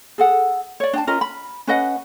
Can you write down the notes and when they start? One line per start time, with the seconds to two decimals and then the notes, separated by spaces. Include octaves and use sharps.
0.18 G#4 A4 F#5
0.80 C#5 D5
0.93 D4 G5 A5
1.07 C#4 F4 A#4 D#5
1.21 B5
1.67 C#4 B4 D#5 F#5